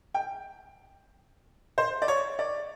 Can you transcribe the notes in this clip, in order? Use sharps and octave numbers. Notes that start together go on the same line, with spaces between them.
G5
C5
D5
C#5
D5